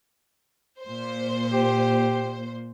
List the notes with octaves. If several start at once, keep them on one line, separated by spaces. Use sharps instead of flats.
A#2 C5
G4